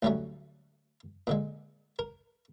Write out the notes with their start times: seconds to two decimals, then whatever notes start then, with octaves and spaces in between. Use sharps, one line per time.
0.03 D2 A2 F#3 G3 A3 C#4
1.27 A#2 D3 G#3
1.99 A#4